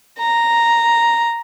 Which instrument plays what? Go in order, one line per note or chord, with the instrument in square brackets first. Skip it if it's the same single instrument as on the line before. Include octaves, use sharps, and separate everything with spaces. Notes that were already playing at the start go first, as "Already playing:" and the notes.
[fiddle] A#5